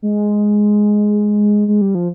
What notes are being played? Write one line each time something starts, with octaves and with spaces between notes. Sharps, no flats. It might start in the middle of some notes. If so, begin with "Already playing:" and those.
G#3
G#3
G3
F3